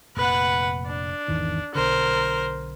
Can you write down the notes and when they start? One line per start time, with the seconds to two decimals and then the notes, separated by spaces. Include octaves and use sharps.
0.17 F1 A#2 B4 F#5
0.87 D4
1.28 G#1 E2 D#3
1.75 B1 D3 A#4 C5